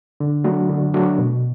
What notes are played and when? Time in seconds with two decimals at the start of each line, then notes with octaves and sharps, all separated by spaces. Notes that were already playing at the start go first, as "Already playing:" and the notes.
0.20 D3
0.44 F#3 A3 D4 F#4
0.69 D3
0.94 F#3 A3 D4 F#4
1.19 B2